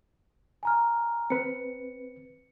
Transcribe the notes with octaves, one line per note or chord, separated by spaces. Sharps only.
G#5 A#5 F6
C4 B4 C#7